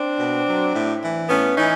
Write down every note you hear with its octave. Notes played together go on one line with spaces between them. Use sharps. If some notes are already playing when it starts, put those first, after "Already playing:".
Already playing: C4 D4
B2
F#3
A2
E3
A2 B3 C#4
E3 C#4 D#4